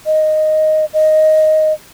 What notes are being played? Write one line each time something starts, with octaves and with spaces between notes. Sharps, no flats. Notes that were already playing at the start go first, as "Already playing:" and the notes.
D#5
D#5